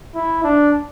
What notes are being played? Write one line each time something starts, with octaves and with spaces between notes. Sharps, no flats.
E4
D4